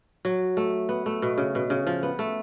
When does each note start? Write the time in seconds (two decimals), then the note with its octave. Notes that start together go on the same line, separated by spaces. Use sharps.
0.25 F#3
0.57 A3
0.89 B3
1.06 A3
1.22 B2
1.38 C#3
1.55 B2
1.70 C#3
1.87 F3
2.03 B3
2.19 A3